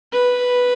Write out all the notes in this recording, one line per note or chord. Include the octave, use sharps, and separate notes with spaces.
B4